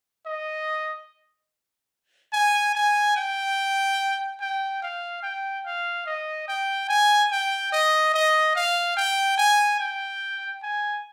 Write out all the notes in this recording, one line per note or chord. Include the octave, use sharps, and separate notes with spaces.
D#5
G#5
G#5
G5
G5
F5
G5
F5
D#5
G5
G#5
G5
D#5
D#5
F5
G5
G#5
G5
G#5